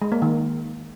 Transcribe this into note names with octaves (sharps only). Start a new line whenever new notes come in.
G#3
A#3
D#3